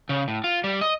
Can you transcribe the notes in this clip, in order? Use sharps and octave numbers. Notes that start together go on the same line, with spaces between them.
C#3
A2
F4
G3
D#5